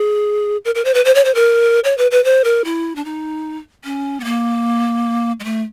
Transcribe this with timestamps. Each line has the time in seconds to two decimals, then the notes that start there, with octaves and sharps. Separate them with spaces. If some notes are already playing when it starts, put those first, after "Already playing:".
Already playing: G#4
0.65 A#4
0.75 A#4
0.85 C5
0.94 B4
1.05 C5
1.15 C#5
1.25 C5
1.35 A#4
1.84 C#5
1.98 B4
2.11 B4
2.24 C5
2.44 A#4
2.65 E4
2.96 D4
3.05 D#4
3.84 C#4
4.20 B3
4.24 A#3
5.40 G#3
5.44 A3